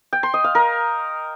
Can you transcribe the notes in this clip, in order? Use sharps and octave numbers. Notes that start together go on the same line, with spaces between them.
G5
C6
D#5
F5
A#4